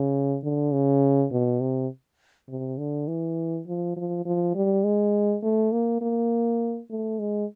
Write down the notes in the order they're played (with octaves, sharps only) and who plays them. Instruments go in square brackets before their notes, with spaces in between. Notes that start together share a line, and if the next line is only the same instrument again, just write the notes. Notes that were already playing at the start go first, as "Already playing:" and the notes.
Already playing: [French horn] C#3
D3
C#3
B2
C3
C3
D3
E3
F3
F3
F3
G3
G#3
A3
A#3
A#3
A3
G#3